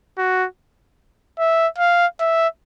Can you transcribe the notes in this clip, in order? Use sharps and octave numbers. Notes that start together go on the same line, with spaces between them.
F#4
E5
F5
E5